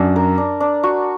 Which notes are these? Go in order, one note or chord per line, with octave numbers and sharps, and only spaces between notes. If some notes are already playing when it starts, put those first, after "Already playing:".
Already playing: F#2 D4
A#4
D4
D4
F#4